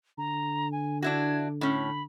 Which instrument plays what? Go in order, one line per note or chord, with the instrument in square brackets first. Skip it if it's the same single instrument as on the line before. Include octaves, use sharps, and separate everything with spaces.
[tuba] D3 [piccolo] A#5
[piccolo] G#5
[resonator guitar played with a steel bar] D4 E4 F#4 [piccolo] G#6
[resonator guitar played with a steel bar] A2 C#4 [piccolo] B5